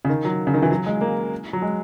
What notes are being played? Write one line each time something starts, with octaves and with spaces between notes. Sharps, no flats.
C#3
D#3
F#3
C#3
D#3
E3
F#3
G#3
A#3
F#3
G#3